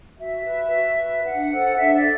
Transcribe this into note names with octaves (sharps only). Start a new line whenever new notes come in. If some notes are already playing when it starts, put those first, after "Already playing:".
F#4 E5
B4
F#4
B4
D4 F#5
A4 C5
D4 E5
D5
A4